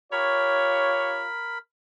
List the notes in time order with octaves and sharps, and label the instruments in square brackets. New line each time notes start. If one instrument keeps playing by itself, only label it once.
[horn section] F4 G4 C#5 [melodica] A#4 B5